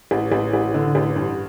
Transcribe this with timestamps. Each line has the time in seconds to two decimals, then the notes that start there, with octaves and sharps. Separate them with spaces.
0.11 A1
0.32 A1
0.53 A1
0.74 D3
0.95 A1
1.16 G2